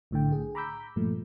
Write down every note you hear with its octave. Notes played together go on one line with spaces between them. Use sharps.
B1 A2 D3 G5
G#4
A#5 B5 D6 E6 G6 B6
G2 A#2 F3 A3